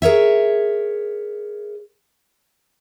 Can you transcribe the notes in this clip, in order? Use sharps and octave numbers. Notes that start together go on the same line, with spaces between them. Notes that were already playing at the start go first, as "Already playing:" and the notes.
G#4 A#4 C#5 E5